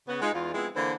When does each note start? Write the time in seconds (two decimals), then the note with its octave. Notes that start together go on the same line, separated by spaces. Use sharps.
0.08 C#3 B3 F#5
0.22 G#3 D#4 F4
0.34 E2 F4
0.54 F3 G#3 B3 C4 E4
0.76 D3 E3 A#3 D4 A4 C5